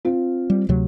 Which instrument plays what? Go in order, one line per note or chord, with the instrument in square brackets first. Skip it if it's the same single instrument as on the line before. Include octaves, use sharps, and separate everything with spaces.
[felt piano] C4 F4
[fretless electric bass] G3
D2 C3 F#3